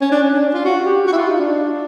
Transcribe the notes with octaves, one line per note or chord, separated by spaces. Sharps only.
C#4
D4
C#4
D4
F4
F#4
G4
F#4
E4
F4
D#4
D4